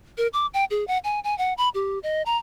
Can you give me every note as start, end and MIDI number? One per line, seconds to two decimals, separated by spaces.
0.18 0.28 70
0.33 0.46 86
0.54 0.65 79
0.71 0.87 68
0.88 0.98 78
1.04 1.20 80
1.24 1.36 80
1.38 1.53 78
1.58 1.69 83
1.74 1.99 67
2.03 2.22 75
2.26 2.37 82